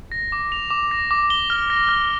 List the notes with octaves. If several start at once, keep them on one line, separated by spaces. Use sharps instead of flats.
A#6
D6
F7
D6
A#6
D6
G7
F6
A#6
F6